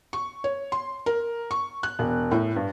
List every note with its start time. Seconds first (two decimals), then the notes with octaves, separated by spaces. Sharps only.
0.13 C#6
0.44 C#5
0.72 C6
1.06 A#4
1.51 C#6
1.83 F#6
1.99 E1
2.31 A2
2.56 G2